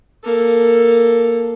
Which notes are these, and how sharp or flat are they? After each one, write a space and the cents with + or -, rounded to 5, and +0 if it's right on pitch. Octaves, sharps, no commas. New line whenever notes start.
A#3 +0 A4 +5